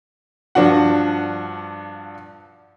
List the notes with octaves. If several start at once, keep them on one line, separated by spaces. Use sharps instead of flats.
G2 F3 D4 F#4 F#5